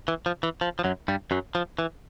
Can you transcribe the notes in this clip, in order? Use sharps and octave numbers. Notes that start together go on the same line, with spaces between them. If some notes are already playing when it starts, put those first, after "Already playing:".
E3
F3
E3
F3
F3
F#2 F#3
G2 G3
F#2 F#3
F3
E3